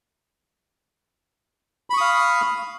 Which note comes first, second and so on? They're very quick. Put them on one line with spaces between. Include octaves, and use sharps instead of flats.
B5 C#6 D#6 F5